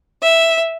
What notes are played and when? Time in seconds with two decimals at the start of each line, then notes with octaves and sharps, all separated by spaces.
0.21 E5